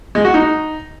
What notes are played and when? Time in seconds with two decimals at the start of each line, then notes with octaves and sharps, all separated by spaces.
0.15 G#3
0.25 F#4
0.34 D#4